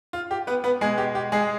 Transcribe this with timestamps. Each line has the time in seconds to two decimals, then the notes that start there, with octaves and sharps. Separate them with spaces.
0.13 F4
0.31 G4
0.47 B3 B4
0.64 B3 B4
0.81 B2 G#3 G#4
0.98 G4
1.15 G4
1.32 G#3 G#4